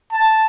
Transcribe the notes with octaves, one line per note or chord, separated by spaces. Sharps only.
A5